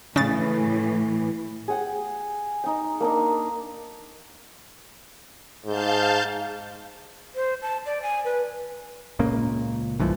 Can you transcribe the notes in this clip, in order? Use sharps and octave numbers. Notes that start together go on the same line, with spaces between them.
A2 C#3 E3 A6
G#4 F#5 G5
D#4 G5
A#3 D4 D#4
G#2 F5 A5 G6
C5
A5
D5
G#5
B4
C#2 A#2 C#3 A#3
B1 G2 E3 F3